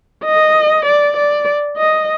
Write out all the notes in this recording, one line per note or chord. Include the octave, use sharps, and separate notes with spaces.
D#5
D5
D5
D#5